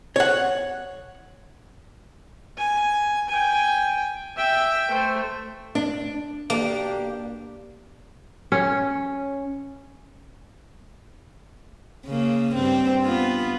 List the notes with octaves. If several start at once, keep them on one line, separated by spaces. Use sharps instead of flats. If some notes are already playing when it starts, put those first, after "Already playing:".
C#5 F#5
G#5
G5 G#5
E5 G5
A3 C5
D4
B2 A#3 D4 G4
C#4
C#3 A#3
G2 C4
B3 F4